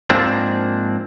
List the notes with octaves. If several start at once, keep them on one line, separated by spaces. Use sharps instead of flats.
G#2 F3 A#3 C4 D4